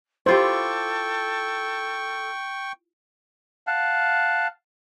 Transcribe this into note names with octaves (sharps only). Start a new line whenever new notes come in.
E4 F4 G4 A4 C5 G5 C#6
F5 F#5 A5